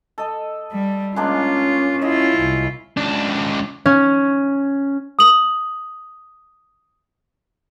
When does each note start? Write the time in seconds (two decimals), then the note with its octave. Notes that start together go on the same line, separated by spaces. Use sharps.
0.18 A4 D#5
0.72 G3
1.16 G#3 A#3 C#4 D4 F4
2.01 E4 F4 C#5 D#5
2.38 C2
2.97 C#2 D4
3.86 C#4
5.19 D#6 F#7